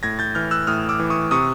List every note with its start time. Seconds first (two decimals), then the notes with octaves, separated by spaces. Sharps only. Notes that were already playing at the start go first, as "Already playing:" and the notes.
0.03 A2 G#6 A#6
0.19 G6 A6
0.35 E3 F6 G6
0.51 E6 F#6
0.67 A2 D#6 F6
0.89 D6 E6
1.00 E3
1.10 C#6 D#6
1.31 C3 C#6 D#6